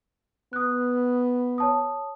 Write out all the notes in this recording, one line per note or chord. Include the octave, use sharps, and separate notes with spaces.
B3 D#6 F#6
C#5 A5 D#6